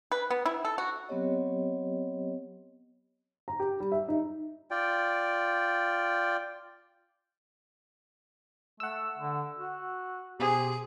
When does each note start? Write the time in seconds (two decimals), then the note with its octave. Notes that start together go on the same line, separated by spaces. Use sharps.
0.12 B4
0.30 B3
0.46 E4
0.65 A4
0.78 F#4
1.08 F#3 B3 C4 G4 C#5 D#5
3.48 A#5
3.60 G4
3.80 G3
3.92 E5
4.08 D#4
4.71 F4 D5 G5
8.80 A3 F#5 E6
9.18 D3
9.59 F#4
10.40 B2 G4 G#4 C5